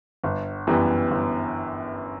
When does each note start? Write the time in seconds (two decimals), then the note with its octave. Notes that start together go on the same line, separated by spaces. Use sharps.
0.24 G1
0.67 F#2 E3 G3 B3
1.11 G1